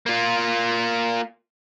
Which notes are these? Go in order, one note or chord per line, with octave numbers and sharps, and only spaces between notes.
A#3 F4